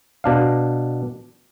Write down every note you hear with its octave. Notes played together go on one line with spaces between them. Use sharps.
B2 D4 F5